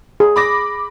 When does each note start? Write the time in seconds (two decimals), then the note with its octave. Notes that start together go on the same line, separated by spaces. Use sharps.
0.20 G#4
0.36 B5 D6 A#6